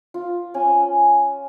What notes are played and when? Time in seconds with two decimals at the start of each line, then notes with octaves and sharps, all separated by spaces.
0.14 F4
0.54 C#4 G#5